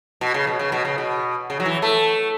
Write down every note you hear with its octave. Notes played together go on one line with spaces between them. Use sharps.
B2
C#3
B2
C#3
B2
C#3
B2
C#3
F#3
E3
A3